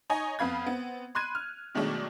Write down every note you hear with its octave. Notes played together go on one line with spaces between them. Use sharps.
D#4 C#5 D#5 G#5
F2 B3 F5 B5 G#6
B3 C4
B5 C6 F#6 G#6 D#7
F6
B2 D#3 F#3 G#3 A3 D4